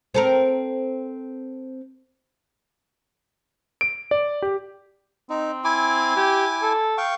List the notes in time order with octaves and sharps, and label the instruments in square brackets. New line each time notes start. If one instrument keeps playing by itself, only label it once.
[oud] C4 A4 A#4
[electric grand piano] D7
D5
G4
[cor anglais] C4 [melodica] D#4
[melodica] E4 G#5 D6
[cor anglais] G4
A4
[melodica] F5 G5 C#6